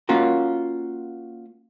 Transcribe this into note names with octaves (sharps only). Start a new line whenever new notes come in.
A#3 C#4 F4 F#4 A#4